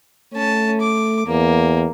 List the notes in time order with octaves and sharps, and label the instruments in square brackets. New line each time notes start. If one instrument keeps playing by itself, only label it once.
[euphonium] A3 [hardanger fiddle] C#4 A5
[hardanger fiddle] D6
[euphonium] E2 [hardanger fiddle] A#3